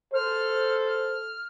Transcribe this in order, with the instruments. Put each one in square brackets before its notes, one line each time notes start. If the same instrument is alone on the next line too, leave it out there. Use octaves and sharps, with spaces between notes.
[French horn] A4 [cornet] C5 [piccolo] F6
[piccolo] F6